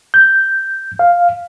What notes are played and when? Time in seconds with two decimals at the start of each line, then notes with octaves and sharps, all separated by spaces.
0.14 G6
0.99 F5